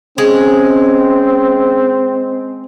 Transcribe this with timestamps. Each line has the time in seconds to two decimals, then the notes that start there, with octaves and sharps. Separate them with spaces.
0.18 G#3 C4 C#4